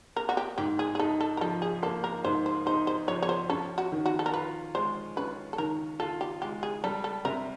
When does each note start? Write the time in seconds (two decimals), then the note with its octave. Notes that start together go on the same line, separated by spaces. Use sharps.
0.16 A#3 A#4
0.29 F#4
0.37 G4
0.58 G#2 G4
0.79 G#4
0.95 G#4
0.99 D#4 A4
1.20 A4
1.37 A#4
1.41 F3 A4
1.62 G#4
1.83 A#3 A4
2.04 A#4
2.24 G#2 C5
2.46 C5
2.66 D#4 C5
2.87 C5
3.08 F3 C#5
3.22 C#5
3.29 C5
3.50 C#4 A4
3.78 F#4
3.92 D#3
4.06 F#4
4.19 A4
4.26 A#4
4.34 F4 B4
4.75 G#3 C5
5.17 C#4 B4
5.53 A4
5.58 D#3 A#4
6.00 F4 A4
6.21 G4
6.42 G#3 G4
6.63 G#4
6.84 G3 A4
7.04 A4
7.25 C3 A#4